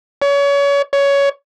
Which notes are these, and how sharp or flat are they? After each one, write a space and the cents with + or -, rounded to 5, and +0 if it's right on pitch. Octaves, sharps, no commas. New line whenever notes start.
C#5 +30
C#5 +15